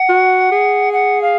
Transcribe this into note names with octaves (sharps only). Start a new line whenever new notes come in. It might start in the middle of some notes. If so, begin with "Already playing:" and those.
Already playing: F#5
F#4
G#4
F#5
F5